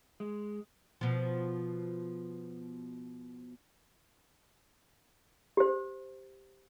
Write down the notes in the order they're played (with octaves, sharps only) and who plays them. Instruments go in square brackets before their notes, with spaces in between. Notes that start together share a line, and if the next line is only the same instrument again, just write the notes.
[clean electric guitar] G#3
[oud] B2 F3
[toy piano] G4 C5